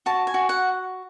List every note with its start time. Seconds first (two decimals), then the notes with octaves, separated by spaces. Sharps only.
0.06 F#4 A5
0.27 G#5
0.34 F#4
0.49 F#5